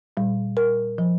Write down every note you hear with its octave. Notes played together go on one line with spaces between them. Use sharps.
A#2 G3
A#4
F3